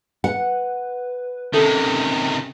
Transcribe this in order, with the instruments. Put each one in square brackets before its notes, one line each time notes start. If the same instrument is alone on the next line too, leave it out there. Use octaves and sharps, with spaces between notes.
[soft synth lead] B4 [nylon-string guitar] F#5
[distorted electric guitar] C3 D#3 [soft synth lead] C#4 [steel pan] A4 E5